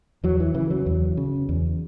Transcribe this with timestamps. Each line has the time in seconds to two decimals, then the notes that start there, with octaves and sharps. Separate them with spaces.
0.24 E2 F#3
0.40 E3
0.54 C#3 E3
0.71 F#3
0.86 E2
1.17 C#3
1.49 E2